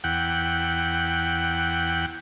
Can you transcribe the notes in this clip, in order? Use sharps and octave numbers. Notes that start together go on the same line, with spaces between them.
E2 F#5 G5